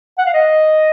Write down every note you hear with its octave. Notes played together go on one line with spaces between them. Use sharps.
F#5
F5
D#5